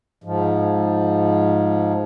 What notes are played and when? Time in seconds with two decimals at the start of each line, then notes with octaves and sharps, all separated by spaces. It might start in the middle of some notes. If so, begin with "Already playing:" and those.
0.24 G#2 F3